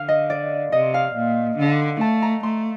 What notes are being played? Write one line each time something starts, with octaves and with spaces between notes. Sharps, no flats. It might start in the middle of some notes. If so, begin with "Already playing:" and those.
Already playing: D3 F5
D#5
D5
C3 D#5
F5
A#2
D3
A3 A5
A#5
A3 C6